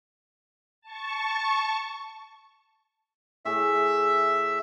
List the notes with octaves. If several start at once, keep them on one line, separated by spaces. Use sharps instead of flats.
A5 C#6
A2 G#4 E5